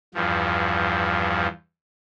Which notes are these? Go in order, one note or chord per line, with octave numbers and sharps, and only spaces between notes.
E2 G2 F3